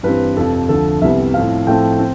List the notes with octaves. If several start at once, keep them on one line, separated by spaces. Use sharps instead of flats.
G2 E3 G3 C4 B4
F2 C3 F3 A4
D2 D3 F3 A4
C2 C3 G3 B3 E5
A2 F3 C4 F5
A2 F3 A3 C4 G5
C4